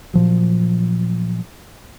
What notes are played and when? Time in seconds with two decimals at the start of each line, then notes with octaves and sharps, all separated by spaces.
0.14 A#2 F3 F#3